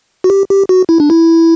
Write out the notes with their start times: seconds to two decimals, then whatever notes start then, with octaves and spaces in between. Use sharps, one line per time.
0.24 F#4
0.30 G4
0.50 G4
0.69 F#4
0.89 E4
1.00 D4
1.10 E4